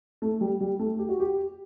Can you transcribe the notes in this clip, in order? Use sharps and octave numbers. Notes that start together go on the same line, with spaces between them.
A3
G3
G3
A3
G4
F#4
G4